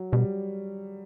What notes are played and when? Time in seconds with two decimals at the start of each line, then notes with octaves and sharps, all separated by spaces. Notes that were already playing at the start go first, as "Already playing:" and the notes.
Already playing: F#3
0.12 B2 G3